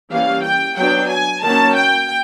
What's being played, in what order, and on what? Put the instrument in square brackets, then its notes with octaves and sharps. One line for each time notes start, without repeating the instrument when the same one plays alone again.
[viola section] E3 G3 A#3 C#4 F5
G5
F#3 B3 D4 G5
G#5
D#3 F#3 A#3 C#4 A5
G5